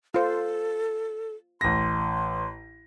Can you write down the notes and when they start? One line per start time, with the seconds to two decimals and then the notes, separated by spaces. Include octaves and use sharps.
0.14 F4 A4 C5
1.61 A1 C6 A#6